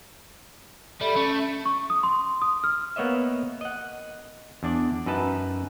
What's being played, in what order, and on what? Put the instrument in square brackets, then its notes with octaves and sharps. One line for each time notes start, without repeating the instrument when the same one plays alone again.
[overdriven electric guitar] G3 [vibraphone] A4 E5 B5
[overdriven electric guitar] A3 [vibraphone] C#4
[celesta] C#6
D#6
C6
D#6
F6
[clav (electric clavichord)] A#3 B3 C#5 D#5 E5
D#5 F#5
E2 D4 D5
F#2 D#4 B4 A5